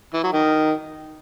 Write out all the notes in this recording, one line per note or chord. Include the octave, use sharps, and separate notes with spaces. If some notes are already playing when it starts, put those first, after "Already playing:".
E3
F#3
D#3